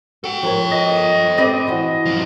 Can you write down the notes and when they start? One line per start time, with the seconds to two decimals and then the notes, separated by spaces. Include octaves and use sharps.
0.24 F#4 A4 G5
0.43 F3 A#4 C#5
0.71 D#5
1.38 C4 B4 D5 D#5
1.68 E3 F#4
2.06 G2 F3